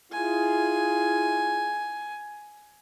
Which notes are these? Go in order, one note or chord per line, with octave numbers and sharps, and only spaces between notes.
E4 F4 G#4 G#5